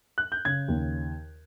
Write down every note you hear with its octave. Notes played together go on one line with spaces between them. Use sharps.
F#6
G6
C#3 G#6
D#2